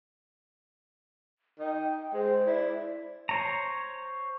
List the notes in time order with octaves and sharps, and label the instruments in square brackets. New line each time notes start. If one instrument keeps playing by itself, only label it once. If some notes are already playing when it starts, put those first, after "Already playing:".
[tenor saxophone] D#4 [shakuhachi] G5
[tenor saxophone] G#3 [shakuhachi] C5
[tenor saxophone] E4 [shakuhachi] D5
[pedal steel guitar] C5 C#5 A#5